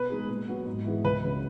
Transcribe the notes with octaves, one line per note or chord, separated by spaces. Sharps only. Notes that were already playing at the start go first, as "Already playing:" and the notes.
Already playing: B2 B4
G#3 D#4 G#4
A#2
F#3 B3 F#4
G#2
E3 B3 E4 G#4
C#2 B4
C#3 F#3 C#4